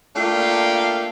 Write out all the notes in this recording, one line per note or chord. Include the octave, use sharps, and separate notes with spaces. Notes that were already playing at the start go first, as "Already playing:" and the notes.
A3 A#3 D4 F4 F5 G5